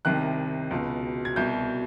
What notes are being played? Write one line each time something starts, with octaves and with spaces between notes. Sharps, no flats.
C2 C3 D#3 F#6
C#2 B2
G#6
C2 B2 G6